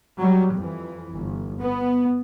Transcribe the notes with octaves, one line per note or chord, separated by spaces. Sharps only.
F#3 G3
F2 E3
G1
B3